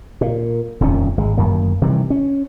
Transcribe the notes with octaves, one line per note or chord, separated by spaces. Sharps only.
A#2
D#1 F2 D#3 C#4
G#1 G#3
G1 F#2 D#3 A#3
C3 D#3 E3 G3
C#4